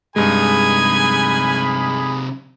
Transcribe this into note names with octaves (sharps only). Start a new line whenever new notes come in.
G2 C3 G#3 D#4 G#4 G#5 B5